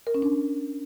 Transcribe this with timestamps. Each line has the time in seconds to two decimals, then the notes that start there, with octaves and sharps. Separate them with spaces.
0.07 A#4
0.14 C#4
0.22 D4